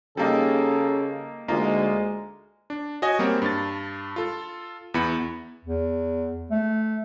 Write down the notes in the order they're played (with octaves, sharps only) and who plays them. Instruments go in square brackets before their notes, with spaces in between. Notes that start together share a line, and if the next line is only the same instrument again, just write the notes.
[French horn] C#3 [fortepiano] G3 A#3 D#4 [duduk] A4
[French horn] D2 [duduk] G#3 [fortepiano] A#3 D#4 F4
[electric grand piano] D4
F#4 C#5 D#5 G#5
G3 A#3 C4 A#4 C#5
G2 D4 A6
F4 A4
E2 B3 E4 B5 C#7
[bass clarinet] E2
A3